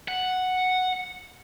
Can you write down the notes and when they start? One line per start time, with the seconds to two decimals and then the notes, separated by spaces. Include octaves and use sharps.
0.08 F#5